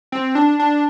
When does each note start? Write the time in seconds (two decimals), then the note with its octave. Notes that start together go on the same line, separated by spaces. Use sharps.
0.12 C4
0.35 D4
0.59 D4